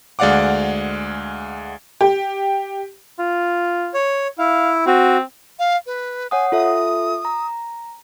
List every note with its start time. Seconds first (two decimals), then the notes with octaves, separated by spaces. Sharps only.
0.19 D2 G#3 D5 F5 F#5 D6
2.01 G4
3.19 F4
3.94 C#5
4.39 E4 F5
4.86 C4 F#4
5.59 F5
5.86 B4
6.31 C#5 F#5 G#5 D#6
6.52 F4 A4 E5 D#6
7.25 A#5